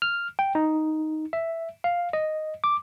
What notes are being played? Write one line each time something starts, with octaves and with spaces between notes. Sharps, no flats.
F6
G5
D#4
E5
F5
D#5
D6